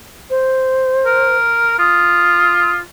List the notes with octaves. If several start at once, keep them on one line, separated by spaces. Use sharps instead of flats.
C5
A#4
F4 D#6